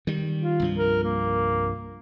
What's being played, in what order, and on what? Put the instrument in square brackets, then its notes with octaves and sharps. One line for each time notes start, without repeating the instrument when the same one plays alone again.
[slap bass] D#3 G3
[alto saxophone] F4
[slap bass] C2 G2 F3
[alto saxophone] A#4
A#3